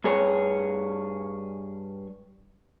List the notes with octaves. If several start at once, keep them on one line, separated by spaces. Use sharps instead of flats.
G2 G#4 C#5